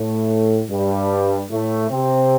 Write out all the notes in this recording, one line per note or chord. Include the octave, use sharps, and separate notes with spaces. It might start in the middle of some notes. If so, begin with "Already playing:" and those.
Already playing: A2 A3
G2 G3
A2 A3
C3 C4